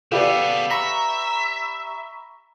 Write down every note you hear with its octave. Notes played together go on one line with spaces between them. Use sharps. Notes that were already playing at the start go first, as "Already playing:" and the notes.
C#3 B3 G4 A4 B4 D5 F5 D6
E5 A#5 B5 C#6 E6